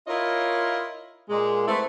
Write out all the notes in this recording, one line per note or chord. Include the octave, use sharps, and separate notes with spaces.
E4 F4 A#4 C#5 D#5
A#2 G#3
A3 B3 C4 E4